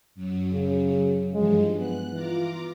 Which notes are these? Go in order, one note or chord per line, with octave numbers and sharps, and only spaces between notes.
F#2 F#3
C#3
G2 E3 F3 G#3
B3 F#6
E3 F4 A#5 D6